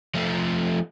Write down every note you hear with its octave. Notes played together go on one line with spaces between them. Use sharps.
F3 A3